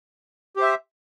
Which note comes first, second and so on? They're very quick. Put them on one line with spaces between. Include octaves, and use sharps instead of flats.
G4 C5 E5